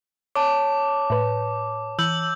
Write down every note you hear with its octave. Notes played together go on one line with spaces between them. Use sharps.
C#5 A5 D6
A2 B4
E3 E6 G6 F#7